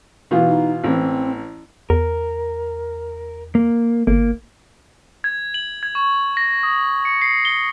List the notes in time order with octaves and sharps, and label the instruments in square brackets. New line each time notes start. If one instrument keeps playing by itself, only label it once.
[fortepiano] B2 E3 F4
[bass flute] D#4
[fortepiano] A1 E3 [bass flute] C4
[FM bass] E2 [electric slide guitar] A#4
[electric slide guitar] A#3
[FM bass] G1 [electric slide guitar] A#3
[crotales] G#6
F#7
G#6
C#6
A#6
D#6
C#7
C7
G7